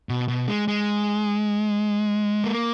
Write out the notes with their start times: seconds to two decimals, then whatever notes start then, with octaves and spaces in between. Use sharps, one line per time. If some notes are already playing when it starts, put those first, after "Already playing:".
0.09 B2
0.28 B2
0.48 G#3
0.68 G#3
2.44 A#3